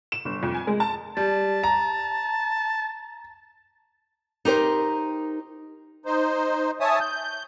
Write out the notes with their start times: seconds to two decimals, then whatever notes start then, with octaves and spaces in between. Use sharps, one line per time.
0.12 E7
0.25 G1
0.43 F2
0.54 G#5
0.67 G#3
0.80 A5
1.17 G3 A5
1.64 A#5
4.45 D#4 G4 A#4 C5
6.06 D#4 C5
6.80 C#5 E5 G#5 A5 D#6
7.00 G6